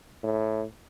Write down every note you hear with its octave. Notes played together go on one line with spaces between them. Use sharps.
A2